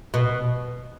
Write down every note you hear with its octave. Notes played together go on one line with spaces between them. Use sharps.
B2